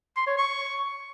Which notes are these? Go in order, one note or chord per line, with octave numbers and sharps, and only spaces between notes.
C6
C#5
C#6